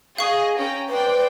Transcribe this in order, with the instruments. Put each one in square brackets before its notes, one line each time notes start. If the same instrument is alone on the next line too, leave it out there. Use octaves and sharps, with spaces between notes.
[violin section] G#4 D#5 [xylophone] F5 C#6
[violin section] C#4 G5 A#5
[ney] B4 [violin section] C5 D5 G5